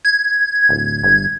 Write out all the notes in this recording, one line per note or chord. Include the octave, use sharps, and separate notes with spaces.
G#6
D1
G1